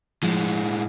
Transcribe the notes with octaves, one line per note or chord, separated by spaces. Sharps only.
A2 F3 G#3